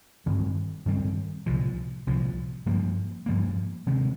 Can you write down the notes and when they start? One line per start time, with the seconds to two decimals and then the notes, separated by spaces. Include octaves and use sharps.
0.26 G2 D#3 G3 C4
0.86 G2 D#3 G3 C4
1.46 C2 A#2 F3
2.07 C2 A#2 F3
2.66 G2 F3 A#3
3.26 G2 F3 A#3
3.87 C3 D#3 G#3